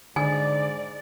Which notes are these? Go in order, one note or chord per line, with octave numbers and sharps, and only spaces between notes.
G#2 D3 D5 G#5